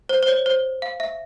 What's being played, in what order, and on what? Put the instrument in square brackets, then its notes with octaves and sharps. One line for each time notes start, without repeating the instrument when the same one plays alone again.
[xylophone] C5
C5
C#5
C5
F5
E5